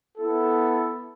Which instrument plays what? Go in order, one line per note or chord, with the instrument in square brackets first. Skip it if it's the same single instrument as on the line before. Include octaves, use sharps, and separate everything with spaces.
[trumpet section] B3 E4 A4